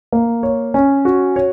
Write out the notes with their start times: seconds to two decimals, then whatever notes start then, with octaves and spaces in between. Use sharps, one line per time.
0.13 A#3
0.43 C#5
0.74 C#4
1.05 F#4
1.36 C#5